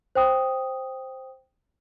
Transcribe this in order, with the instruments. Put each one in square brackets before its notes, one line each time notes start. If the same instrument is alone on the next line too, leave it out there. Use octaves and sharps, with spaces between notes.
[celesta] C5 G5 D#6